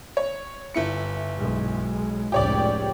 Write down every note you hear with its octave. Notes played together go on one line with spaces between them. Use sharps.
C#5
G1 E4 C#7
B1 G#3
F1 C#2 A2 G4 C#5 D5